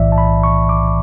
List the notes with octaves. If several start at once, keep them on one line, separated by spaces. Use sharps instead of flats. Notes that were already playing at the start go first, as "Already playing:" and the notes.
Already playing: B1 A2 E3 D5 E5
A5
B5
C#6
D6